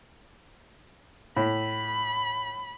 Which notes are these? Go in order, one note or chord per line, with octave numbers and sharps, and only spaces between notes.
A2 B5